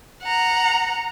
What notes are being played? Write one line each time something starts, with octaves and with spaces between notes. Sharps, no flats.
F#5 A#5